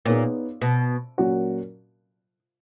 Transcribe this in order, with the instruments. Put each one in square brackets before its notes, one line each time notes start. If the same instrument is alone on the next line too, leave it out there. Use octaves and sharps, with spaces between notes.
[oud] A#2 [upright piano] B3 D#4 G#4 C#5
[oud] B2
[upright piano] A#2 F#3 C#4 F#4 A#4